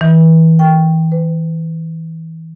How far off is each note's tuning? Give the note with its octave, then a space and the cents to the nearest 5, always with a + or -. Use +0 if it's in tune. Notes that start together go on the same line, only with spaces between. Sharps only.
E3 -30
G5 +0
B4 +35